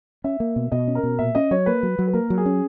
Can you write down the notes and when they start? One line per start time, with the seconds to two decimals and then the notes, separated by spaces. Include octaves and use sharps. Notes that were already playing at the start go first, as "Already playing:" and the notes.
0.24 C#4 E5
0.40 A#3
0.56 B2
0.72 B2 D#5
0.88 C#4
0.95 A#4
1.03 B2
1.19 A#2 E5
1.35 C#4 D#5
1.51 F#3 C#5
1.66 A#3 B4
1.83 F#3
1.99 F#3
2.07 B4
2.13 A#3 A#4
2.30 F#3
2.38 G#4
2.46 C#4